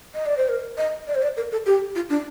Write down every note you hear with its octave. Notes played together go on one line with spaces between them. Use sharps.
D#5
D5
C5
A#4
D#5
D5
C5
D5
A#4
A4
G4
F4
D4